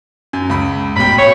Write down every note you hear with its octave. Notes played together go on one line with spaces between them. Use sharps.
F#2
C#2 B5
A1 B2 G5 B5
B1 C#5